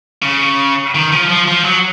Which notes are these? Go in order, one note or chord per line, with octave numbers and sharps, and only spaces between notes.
C#3
D#3
F3
F3
F3
F#3